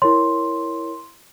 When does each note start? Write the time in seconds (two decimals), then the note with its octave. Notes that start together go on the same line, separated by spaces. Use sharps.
0.02 E4 A#4 C#5 C6